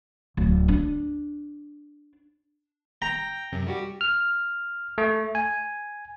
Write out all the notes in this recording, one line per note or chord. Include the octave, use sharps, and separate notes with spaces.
D1
D4
G5 A#5 G6
F#2 C3
G3 F#4 G4
F6
A3
G#5